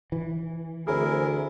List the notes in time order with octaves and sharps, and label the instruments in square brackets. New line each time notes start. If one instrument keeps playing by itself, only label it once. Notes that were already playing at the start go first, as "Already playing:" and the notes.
[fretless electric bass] E3
[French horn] D2 [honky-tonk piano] C4 G#4 [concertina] E4 A#4